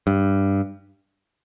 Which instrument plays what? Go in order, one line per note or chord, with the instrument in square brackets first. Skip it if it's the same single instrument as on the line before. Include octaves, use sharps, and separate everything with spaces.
[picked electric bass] G2